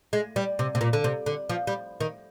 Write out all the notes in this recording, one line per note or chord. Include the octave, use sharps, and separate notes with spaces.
G#3
G3
C3
C3
A#2
D3
C3
D3
F3
G3
D#3